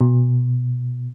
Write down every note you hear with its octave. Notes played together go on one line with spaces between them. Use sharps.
B2